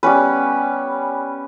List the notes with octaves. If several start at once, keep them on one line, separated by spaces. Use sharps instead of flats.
G3 B3 C#4 B4